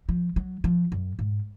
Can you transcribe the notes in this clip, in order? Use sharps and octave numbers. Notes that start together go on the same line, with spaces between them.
F3
F#3
F3
F#2
G#2